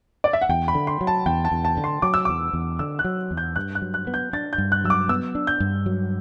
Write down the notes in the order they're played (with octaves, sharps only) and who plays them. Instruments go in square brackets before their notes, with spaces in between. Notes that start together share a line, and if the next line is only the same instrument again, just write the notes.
[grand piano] D5
E5
F#5
[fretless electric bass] E2 [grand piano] G5
[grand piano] B5
[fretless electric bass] D3
[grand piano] C6
[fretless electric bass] F#3
[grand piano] A5
[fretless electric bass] E2 [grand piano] G5
[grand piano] A5
[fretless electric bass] E2
[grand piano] A5
[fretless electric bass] D3
[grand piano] C6
[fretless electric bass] F#3 [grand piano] D6
[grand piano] E6
[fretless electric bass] E2 [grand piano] D6
[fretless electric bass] E2
[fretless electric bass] D3 [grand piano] E6
[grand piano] F#6
[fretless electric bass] F#3
E2
[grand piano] G6
[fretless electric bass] G2 [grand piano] F#6
[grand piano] F#6
[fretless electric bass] F#3
[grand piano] F#6
[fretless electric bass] B3
[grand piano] G6
[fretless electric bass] D4 [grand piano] A6
[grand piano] G6
[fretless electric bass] G2
[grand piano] F#6
[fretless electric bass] F#3 [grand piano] E6
[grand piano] D6
[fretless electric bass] B3 [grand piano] E6
[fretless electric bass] D4
[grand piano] G6
[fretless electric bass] G2
F#3